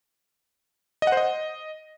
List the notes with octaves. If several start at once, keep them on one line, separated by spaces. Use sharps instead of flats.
D#5
F#5
C5
D#5